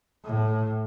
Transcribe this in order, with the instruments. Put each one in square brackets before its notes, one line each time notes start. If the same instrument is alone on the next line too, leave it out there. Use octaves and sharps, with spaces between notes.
[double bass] A2